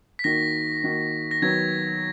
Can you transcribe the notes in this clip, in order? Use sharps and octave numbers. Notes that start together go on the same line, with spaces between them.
B6
D#3 A#3 D#4 F#4 A#6
D#3 A#3 D#4 F#4
A#6
D#3 F#3 B3 G#6